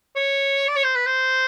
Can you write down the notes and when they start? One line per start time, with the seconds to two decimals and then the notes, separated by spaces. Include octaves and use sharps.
0.16 C#5
0.68 D5
0.76 C#5
0.83 C5
0.95 B4
1.06 C5